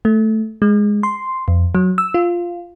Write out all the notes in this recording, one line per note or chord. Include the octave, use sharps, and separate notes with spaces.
A3
G#3
C6
F2
F#3
E6
F4